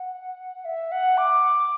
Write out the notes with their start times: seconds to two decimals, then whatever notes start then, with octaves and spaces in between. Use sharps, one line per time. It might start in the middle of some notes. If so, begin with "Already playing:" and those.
Already playing: F#5
0.65 E5
0.92 F#5
1.18 D6